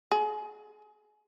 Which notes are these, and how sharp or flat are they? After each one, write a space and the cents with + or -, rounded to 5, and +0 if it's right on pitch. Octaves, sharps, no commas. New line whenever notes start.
G#4 +35